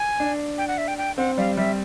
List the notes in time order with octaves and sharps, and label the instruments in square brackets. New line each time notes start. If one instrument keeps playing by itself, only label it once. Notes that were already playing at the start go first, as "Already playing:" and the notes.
Already playing: [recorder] G#5
[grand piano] D4
[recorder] G5
F#5
E5
G5
G5
[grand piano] C4 [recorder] F#5
[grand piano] G3 [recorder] F5
[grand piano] G3 [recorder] E5